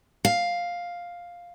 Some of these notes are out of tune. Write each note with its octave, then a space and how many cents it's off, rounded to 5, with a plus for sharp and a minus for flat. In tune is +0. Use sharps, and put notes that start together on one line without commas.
F5 +5